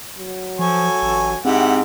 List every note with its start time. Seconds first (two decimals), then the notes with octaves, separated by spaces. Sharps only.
0.19 F#3
0.59 F3 A4 G#5 C#6
1.03 A1
1.45 G#2 C4 E4 G4 F#5